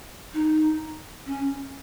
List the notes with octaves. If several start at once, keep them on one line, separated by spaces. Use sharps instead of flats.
D#4
C#4